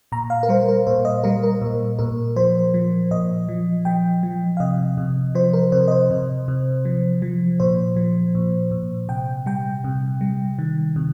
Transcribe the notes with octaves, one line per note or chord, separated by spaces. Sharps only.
A#2 A#5
F5
A#4
G3 C5
A#4
A#2 C5
D#5
G3 A#4
A#4
A#2
A#2 A#4
F3 C5
F3
A#2 D#5
F3
F3 G5
F3
F5
C3 D#5
C3
F3 C5
A#4
C3 C5
D#5
C5
C3
C3
F3
F3
A#2 C5
F3
A#2
A#2
C3 G5
G3 G5
C3
G3
D#3
C3